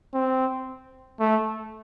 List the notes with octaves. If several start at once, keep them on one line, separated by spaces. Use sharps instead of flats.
C4
A3